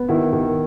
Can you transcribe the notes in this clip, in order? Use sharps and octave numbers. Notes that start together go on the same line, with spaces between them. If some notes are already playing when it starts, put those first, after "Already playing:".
Already playing: B3
D#3 E4 F#4
D#3